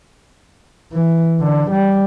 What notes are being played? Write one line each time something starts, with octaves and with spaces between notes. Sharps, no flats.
E3
D3
G3